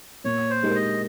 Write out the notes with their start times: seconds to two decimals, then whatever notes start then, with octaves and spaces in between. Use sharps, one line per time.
0.24 A#2 C#5
0.50 C5
0.63 G#3 D#4 G4 A#4
0.75 D#5